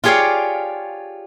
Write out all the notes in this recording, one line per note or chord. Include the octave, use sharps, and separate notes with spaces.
F4 G4 G#4 C#5 D5 F5